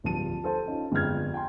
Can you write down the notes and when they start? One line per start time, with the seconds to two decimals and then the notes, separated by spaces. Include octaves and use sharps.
0.04 D1 G2 F3 A5 D#7
0.44 A4 C5 A5
0.66 C#4 D#4 F4
0.92 G1 F2 G#3 G5 F6 G#6
1.34 G5 G#5 A#5 C6